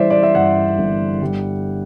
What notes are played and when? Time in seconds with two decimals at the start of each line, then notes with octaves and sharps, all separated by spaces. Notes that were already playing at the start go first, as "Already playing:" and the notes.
Already playing: E3 G3 C5 D5 E5
0.10 D5
0.23 E5
0.35 G2 F#5
0.78 G1
1.22 G3